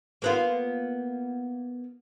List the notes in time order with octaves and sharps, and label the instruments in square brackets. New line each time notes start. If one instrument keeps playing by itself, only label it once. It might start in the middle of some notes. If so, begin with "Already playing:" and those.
[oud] A#3 B3 F4